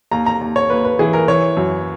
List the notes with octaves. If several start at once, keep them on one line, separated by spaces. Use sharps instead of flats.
D#2 A#5
A#5
D#2
C#5
D#2 B4
B4
E3 G#4
A#4
E3 C#5
F#2